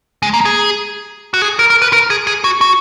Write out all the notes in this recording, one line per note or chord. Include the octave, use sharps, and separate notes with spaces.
G#3
A#3
G#4
F#4
G#4
A#4
A#4
B4
A#4
G#4
G#4
F#4
F#4